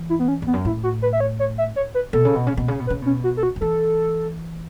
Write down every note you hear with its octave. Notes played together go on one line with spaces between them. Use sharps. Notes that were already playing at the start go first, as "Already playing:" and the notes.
Already playing: E3
E4
B3
C#4
E2 B3
F#2
A2 E4
F#4
B4
E5
C#5
C#5
E5
C#5
B4
B2 A4
C#3
B2
C#3
B2
C#3
B2
B4
C#3
B2 C#4
F#4
A4
F#4
F#3
E3 A4